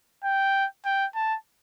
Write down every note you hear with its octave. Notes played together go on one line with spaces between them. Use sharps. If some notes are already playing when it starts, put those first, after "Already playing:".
G5
G5
A5